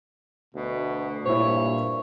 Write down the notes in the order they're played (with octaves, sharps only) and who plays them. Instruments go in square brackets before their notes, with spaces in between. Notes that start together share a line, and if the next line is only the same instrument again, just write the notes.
[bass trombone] D2 [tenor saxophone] B2
[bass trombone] G2 [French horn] A#2 [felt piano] E4 C5 [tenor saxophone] C#5